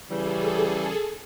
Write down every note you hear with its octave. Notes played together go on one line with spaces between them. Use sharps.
C#3 E3 G3 G#4 A4